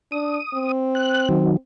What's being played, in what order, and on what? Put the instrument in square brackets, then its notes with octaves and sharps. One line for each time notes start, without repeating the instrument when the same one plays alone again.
[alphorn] D4 [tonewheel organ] D#6
[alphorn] C4
[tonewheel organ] F#6
D#3 F#3